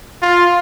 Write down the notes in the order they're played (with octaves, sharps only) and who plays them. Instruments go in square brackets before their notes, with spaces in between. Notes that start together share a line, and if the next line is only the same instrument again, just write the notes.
[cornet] F4